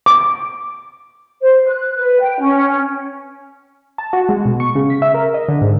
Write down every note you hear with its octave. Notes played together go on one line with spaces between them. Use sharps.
D6
C5
F#6
B4
G5
C#4
A5
F#4
G#3
B2
C#6
C#3
B6
E5
A#4
D#5
D3
G#2